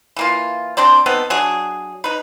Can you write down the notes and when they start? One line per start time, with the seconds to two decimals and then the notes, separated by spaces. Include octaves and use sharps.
0.16 E3 A#3 F4
0.77 C4 D4 C5 D5
1.06 B3 C4 D#4 A4
1.30 F#3 D4 G#4
2.04 D#4 B4